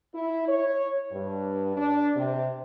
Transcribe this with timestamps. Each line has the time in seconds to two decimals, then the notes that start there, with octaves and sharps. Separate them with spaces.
0.15 E4
0.48 C#5
1.12 G2
1.77 D4
2.16 C3